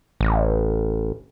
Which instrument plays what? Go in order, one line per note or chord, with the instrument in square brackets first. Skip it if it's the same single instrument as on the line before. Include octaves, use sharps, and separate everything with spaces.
[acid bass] A1